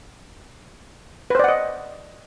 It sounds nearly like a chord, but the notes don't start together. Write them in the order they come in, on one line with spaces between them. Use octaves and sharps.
B4 C5 D5 F#5 D#5